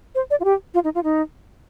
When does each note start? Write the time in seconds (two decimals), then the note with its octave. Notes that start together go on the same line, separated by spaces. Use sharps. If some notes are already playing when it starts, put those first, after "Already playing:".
0.15 C5
0.31 D5
0.40 F4
0.45 G4
0.74 F4
0.84 D#4
0.95 F4
1.04 D#4